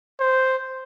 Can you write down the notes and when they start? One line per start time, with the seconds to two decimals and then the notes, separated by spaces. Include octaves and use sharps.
0.20 C5